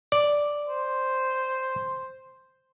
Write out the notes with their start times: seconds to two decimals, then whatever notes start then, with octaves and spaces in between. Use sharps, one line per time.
0.12 D5
0.68 C5